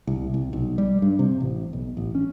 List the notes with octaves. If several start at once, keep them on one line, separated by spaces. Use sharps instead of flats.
C2
C2
B1
G3
G2
C3
A1
B1
A1
C#4